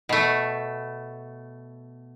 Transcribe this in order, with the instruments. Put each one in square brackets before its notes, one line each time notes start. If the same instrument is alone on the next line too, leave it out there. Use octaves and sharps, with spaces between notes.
[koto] B2 A3